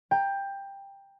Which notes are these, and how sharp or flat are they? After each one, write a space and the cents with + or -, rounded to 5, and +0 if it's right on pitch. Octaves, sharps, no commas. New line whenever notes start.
G5 +15 A#5 +0